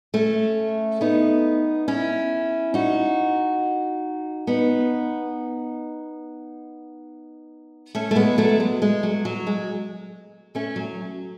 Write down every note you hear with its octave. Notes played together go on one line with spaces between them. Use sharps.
A3 C#4
B3 D#4
C#4 E4
D#4 F#4
B3 D#4
A3 C#4
A3
G#3 B3
F#3 A3
G#3
G#3
F#3
F#3
G#3
A3 C#4
F#3